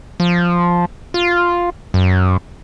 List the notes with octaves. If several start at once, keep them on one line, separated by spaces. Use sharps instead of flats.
F3
F4
F#2